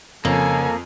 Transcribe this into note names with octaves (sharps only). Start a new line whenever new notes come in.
F2 C#3 A#3 A4 G#5